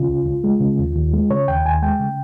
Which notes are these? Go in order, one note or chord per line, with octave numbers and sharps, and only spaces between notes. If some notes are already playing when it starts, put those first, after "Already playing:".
Already playing: C#3 F4
C#2
C#2
G#3
C#3
D#2
D#2
G#3
C#3 C#5
D#2 G5
D#2 G#5
G#3 G5
C#3